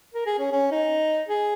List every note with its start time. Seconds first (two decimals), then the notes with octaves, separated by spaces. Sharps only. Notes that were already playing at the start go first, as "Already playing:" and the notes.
0.14 A#4
0.27 G#4
0.38 C#4
0.52 C#4
0.71 D#4
1.28 G#4